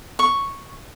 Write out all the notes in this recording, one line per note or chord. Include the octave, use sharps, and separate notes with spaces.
C#6